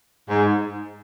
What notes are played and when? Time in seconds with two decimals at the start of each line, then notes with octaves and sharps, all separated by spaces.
0.29 G#2